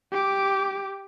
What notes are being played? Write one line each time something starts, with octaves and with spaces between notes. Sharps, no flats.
G4 D6